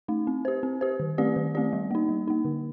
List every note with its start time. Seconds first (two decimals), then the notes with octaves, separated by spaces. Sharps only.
0.08 A3 D#4
0.27 C4
0.45 G4 C5
0.63 C4
0.81 G4 C5
1.00 D#3
1.18 A3 C4 G4 D5
1.36 D#3
1.55 A3 C4 G4 D5
1.73 G3
1.91 A#3 D#4
2.09 G3
2.28 A#3 D#4
2.45 D3